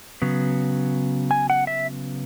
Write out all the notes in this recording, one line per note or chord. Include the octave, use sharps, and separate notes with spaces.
C#3 F#3 B3
G#5
F#5
E5